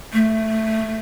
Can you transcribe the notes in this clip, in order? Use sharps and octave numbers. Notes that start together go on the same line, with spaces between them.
A3